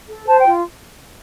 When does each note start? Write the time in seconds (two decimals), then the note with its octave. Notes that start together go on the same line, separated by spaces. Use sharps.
0.08 A4
0.26 C5 A5
0.40 G5
0.44 F4